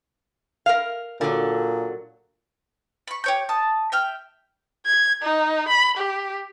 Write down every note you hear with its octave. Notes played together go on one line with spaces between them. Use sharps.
A#4 F5
A#2 D3 F#3
B5 C#6
G4 C#5 G6
A5 D#6
E5 G5 F6
G#6
D#4
B5
G4